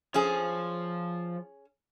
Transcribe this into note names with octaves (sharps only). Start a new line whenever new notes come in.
F3 C#4 G#4